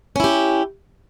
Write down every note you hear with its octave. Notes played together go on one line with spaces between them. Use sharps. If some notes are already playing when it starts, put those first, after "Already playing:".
C#4 E4 G4